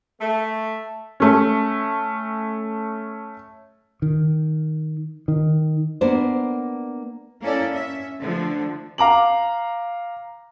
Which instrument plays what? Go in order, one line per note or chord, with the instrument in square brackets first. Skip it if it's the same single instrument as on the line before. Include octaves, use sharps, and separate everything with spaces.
[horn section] A3
[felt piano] A3 C#4
[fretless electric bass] D#3
D#3
[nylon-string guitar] A#3 B3 D4 C5
[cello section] A#3 C#4 E4 A4 D5
C#4 E5
D3 F3 A3
[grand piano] F5 A#5 D6 F#7